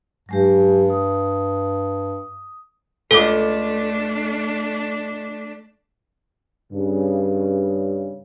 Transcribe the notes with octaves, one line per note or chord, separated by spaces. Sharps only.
G2 F#3 G#3 G4
D#6
C#2 A3 D4 A4 D6
G2 C#3